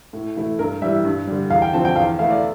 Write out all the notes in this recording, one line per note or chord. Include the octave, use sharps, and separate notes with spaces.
A2
E3 A3 E4
G2 A#4
E3 G3 E5
G2
D3 G3
E2 F5
G5
D3 F3 C4 A5
G5
E2 F5
E3 A3 E4 F5
D5